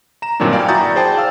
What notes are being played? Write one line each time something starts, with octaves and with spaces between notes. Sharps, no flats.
A#5 E7
G2 A#2 D#3 F#3 C4 D4
D5 F5 G5 G#5
E4 F#4 A#5 D#6 G6 A6
G#4 C5 D5 G5 A5
F5 E6